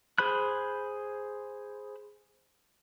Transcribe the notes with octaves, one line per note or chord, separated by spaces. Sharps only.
G#4 C5 B5 F#6